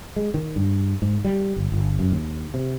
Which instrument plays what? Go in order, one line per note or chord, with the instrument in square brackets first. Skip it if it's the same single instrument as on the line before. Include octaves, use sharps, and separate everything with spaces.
[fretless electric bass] G#3
D#3
G2
G#2
G3
G1
G1
F#2
D#2
C3